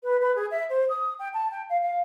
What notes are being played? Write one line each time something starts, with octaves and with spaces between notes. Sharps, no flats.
B4
B4
G#4
E5
C5
D#6
G5
A5
G5
F5
F5